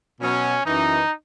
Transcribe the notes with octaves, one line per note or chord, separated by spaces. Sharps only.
B2 F#3 C#4
F#2 E3 D#4